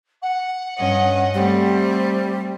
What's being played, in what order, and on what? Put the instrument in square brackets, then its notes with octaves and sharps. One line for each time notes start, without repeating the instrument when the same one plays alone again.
[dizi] F#5
[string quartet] G2 C#4 D#5
[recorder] G3 [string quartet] A3 C4